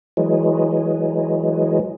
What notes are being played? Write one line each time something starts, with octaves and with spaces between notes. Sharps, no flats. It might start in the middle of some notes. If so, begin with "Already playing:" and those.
E3 F#3 G#3